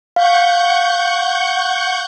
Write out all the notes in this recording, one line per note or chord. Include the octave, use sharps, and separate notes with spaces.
F5 F#5 C#6 G6